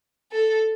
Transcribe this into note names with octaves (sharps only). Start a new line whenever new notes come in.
A4